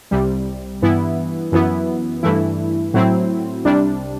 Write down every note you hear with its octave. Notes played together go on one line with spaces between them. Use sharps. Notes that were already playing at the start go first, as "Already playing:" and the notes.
C2 C3 G3
G2 E3 B3 E4
F#2 E3 B3 E4
G2 E3 A3 E4
A2 F#3 C4 E4
C2 C3 G3 D4